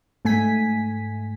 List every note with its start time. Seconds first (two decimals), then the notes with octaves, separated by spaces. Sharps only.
0.25 G#2 A3 G#5 B6